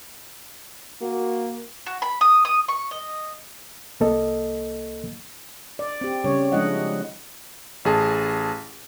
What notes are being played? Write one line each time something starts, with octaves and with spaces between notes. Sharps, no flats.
A#3 F#4
F#4
B5
D#6
D#6
C#6
D#5
C2 A#3 A4 D#5
D5
C4 G4
C#3 G3 C#5
F3 G#3 D4 E4 D#5 F#5
A1 G#4 A5